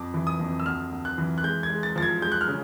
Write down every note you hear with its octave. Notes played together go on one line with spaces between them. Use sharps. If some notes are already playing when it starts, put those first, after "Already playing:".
Already playing: F2 D6
E3
D#6
F2
E6
D2 F6
D2
F#6
E3
F#6
G#3 G6
G#6
G#3
A6
F3 A6
G#6
G#3 G6
F#6
F6
C#3